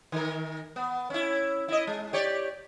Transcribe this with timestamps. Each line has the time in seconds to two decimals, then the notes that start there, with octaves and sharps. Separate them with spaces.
0.12 D#3 A#4
0.76 B3
1.10 C#4 E4
1.68 E4 D#5
1.87 G#3
2.13 G4 C#5 D5